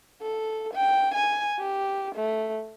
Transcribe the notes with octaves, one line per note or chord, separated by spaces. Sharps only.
A4
G5
G#5
G4
A3